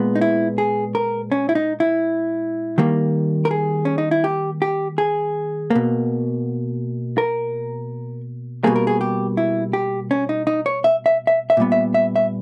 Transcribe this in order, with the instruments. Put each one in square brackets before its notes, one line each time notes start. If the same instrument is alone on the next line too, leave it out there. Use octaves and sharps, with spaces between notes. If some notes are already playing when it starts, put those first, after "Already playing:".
Already playing: [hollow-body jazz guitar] A#2 G#3 B3
D#4
E4
G#4
A#4
C#4
E4
D#4
E4
D#3 G3 A#3
A#4
G#4
C#4
D#4
E4
G4
G4
G#4
B2 A#3
A#4
B2 G3 A#3 G#4
A#4
G#4
G4
E4
G4
C#4
D#4
D#4
C#5
E5
E5
E5
E5
A#2 G3 B3
E5
E5
E5